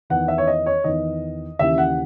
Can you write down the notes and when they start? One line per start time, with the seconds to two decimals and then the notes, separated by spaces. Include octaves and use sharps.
0.10 E2 D#3 F#5
0.28 E5
0.38 C#5
0.47 D#5
0.66 C#5
0.84 E2 D#3 D#5
1.59 D#2 C#3 E3 E5
1.78 F#5